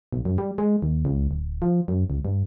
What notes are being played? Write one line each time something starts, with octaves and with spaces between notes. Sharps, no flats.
B1
F#2
G3
G#3
D#2
C#2
D1
F3
F#2
C#2
G2